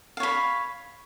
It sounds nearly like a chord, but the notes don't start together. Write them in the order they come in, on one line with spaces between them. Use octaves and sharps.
F5 C#5 B5